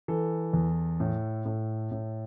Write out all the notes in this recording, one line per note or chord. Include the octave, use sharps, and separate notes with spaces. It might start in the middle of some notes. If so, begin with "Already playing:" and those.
E3 A4
E2
A2
A2
A2